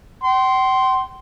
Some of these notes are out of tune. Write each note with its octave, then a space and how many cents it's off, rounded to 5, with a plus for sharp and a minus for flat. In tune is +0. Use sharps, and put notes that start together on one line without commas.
G5 -45 C6 +0